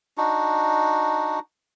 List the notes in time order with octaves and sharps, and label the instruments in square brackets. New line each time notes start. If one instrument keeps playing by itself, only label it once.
[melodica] D4 D#4 F#4